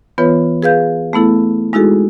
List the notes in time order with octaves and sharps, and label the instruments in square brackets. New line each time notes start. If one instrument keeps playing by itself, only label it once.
[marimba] E3 B3 F4 B4 C#5
G#4 B4 F5 G6
A3 B3 E4 A4
G#3 D#4 E4 F#4 G#4 A4